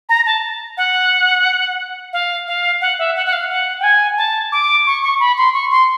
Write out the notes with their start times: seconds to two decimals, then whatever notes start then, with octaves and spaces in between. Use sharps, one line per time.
0.09 A#5
0.26 A5
0.77 F#5
2.13 F5
2.47 F5
2.81 F#5
2.99 E5
3.16 F#5
3.26 F#5
3.33 F5
3.49 F#5
3.80 G5
3.83 G#5
4.18 A5
4.52 D6
4.87 C#6
5.03 C#6
5.20 B5
5.37 C6
5.54 C#6
5.71 C6